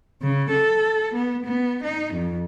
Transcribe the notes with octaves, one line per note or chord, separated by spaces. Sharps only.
C#3
A4
B3
B3
D#4
F2